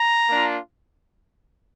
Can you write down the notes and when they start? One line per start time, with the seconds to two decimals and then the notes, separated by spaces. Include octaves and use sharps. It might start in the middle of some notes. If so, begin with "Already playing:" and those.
Already playing: A#5
0.29 A#3 D4 F4